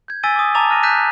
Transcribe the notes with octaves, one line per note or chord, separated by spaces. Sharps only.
G6 G#6
G#5 E6 A6 B6 D#7 G7
D6 D#6
A5 A#5 D6 E6 A6 F7
F6 F#6 A#6 D#7
F#6 G6 A6 B6 D#7 E7